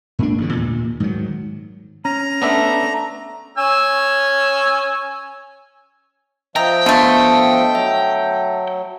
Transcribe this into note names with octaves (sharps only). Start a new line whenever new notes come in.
G#2 A#3 D4
A1 G2 D3
D#2 A#2
G#2 D#3 F#3
C#4 A#5
A3 B3 D4 E5
C#4 G#5 E6
F3 D#5 E5 G5 A#5 G6
D3 A3 B3 F5 A5
F#3 E5